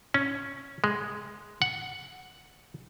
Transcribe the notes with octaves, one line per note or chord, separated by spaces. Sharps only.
C#4
G#3
F#5